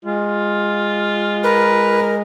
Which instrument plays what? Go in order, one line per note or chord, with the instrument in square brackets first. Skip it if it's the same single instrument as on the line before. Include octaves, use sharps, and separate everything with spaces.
[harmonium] G#3 [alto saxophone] F4
[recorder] A#4 [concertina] B4